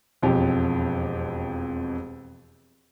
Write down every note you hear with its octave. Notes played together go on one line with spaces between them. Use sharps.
E1 F2 G4